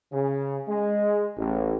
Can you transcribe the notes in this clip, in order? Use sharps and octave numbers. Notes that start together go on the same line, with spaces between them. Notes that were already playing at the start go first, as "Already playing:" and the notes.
C#3
G#3
A1